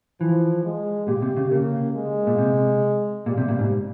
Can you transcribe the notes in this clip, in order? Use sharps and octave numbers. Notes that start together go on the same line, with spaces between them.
E3 F3
G#3
A#2 G4
C3
C#3
C#3 A#3
G#3
A#2
C3
A#2 G3
C3
A#2
G#2